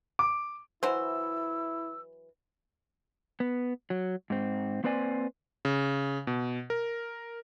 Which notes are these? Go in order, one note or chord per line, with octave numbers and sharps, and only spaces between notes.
D6
E3 F#3 E4 C5 E6
B3
F#3
G#2 C4
A#3 C4 B4 C5 D5 G#5
C#3
B2
A#4